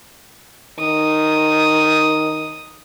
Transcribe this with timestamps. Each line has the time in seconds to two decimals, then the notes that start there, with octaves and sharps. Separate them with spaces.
0.79 D#3 D#6